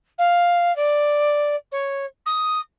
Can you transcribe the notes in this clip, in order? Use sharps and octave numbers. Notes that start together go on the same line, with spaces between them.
F5
D5
C#5
D#6